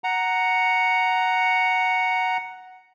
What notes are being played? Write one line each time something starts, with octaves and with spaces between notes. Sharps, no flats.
F#5 A#5